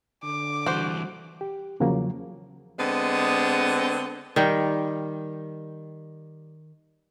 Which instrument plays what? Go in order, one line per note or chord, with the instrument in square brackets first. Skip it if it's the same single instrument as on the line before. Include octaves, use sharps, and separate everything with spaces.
[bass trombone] D3 [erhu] D6
[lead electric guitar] E3 G3 [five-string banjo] F#4 C5
[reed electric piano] G4
E2 C#3 F3 F#3 A#3
[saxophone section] D3 G#3 B3 C4
[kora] D#3 G3 G5